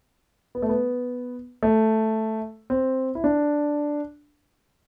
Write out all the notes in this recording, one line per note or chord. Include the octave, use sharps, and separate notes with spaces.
B3
A3
B3
A3
C4
E4
D4